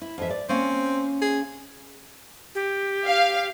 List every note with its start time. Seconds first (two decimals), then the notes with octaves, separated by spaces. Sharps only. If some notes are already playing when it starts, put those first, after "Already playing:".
0.02 E4
0.18 F2 E3 E5
0.30 D5
0.49 A#3 C4 C#4
1.22 G#4
2.55 G4
3.05 F5